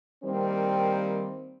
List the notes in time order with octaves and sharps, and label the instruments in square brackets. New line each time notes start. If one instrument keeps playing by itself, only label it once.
[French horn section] D#3 G3 A#3 C4